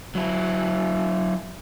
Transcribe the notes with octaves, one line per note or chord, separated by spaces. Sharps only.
F#3 E4